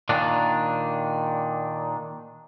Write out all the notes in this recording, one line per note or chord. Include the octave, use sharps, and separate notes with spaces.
A#2 D#3 D4